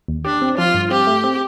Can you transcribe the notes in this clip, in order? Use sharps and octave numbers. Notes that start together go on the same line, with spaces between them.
D#2
D4 G4
C4
F3 F4
G2
C4 G4
A3
C4